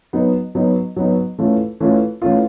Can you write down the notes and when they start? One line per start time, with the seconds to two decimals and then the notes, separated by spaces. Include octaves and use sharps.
0.13 F#3 B3 D#4
0.55 F#3 B3 D#4
0.96 F#3 B3 D#4
1.39 E3 A3 C#4 F4
1.80 E3 A3 C#4 F4
2.22 E3 A3 C#4 F4